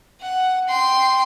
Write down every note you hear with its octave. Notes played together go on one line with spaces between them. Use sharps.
F#5
G5 C6